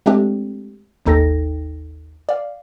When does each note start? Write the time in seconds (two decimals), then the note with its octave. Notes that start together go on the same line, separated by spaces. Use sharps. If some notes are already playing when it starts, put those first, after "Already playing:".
0.06 G#3 A3 C4 D4 G4
1.06 G#1 D#2 D#4 A4 G5 A#6
2.29 D5 F5